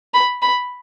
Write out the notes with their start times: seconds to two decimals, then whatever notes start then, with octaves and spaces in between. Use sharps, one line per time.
0.14 B5
0.42 B5